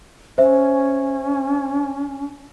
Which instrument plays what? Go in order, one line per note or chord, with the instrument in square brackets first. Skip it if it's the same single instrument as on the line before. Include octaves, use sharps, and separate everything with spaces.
[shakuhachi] C#4 [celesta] C5 E5